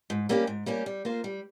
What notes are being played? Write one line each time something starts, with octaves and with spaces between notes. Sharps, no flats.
G#2
G3 A#3 C#4 G4
G#2
G3 A#3 C#4 G4
G3
A#3 F4 C5
G3